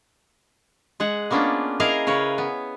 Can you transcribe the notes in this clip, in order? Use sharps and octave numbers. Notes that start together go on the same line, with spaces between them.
G#3 G#4 F#5
A#3 B3 C#4 D4 F4
E4 G#4 A#4 D#5 F5 A#5
C#3 A#4 B4 C#5
B3